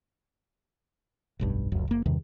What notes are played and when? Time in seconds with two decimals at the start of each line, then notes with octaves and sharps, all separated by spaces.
1.39 F1 B1 G2
1.72 F1 C#2 F#2
1.88 F#1 A#3
2.06 E2 G2 C3 D#3